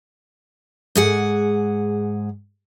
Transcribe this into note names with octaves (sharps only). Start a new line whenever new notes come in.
G#2 G#4 F#5